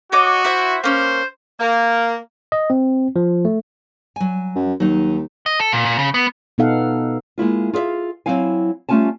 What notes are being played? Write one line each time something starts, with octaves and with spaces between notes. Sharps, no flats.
F#4 C#5 D#5 D6
E4 C5 E5
A#3 C#4 C5
A#3
D#5
C4
F3
A3
F#3 G#5
F#2
D#2 F#3 D#4
D#5
A4
A#2
A#2
C#3
B3
B2 B3 D#4 A4 F5 F#5
G#3 A#3 E4 F4
F4 G#4 C#5 E5 F5
F#3 A3 C4 E4 F5 G#5
G3 A3 C#4 F4 G#5 A5